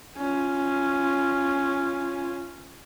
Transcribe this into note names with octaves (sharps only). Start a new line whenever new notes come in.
C#4 F4